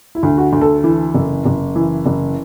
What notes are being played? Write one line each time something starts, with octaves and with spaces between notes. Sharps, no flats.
E4
D2
F#4
D2
A4
E3
F#1
F#1
E3
F#1